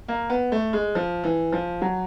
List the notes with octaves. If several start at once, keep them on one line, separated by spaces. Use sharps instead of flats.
A#3
B3
A3
G#3
F3
E3
F3
F#3